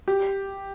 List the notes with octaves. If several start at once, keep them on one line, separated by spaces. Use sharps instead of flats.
G4